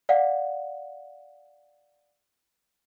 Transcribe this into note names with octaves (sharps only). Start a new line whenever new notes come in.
D5 F5 F#5